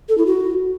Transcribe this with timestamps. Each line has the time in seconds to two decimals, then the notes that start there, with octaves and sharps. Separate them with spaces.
0.09 A4
0.17 E4
0.26 F#4